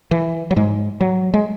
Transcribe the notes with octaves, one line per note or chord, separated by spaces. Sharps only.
E3
F#3
G#2 G#3
F#3
G#3